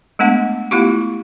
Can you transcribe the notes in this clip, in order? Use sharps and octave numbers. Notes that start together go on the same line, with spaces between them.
G#3 A3 B3 D4 F#5
A3 B3 E4 F4 G4